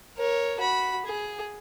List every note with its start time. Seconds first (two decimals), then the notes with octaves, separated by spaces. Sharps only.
0.18 A#4 C#5
0.60 F#4 B5
1.05 G#4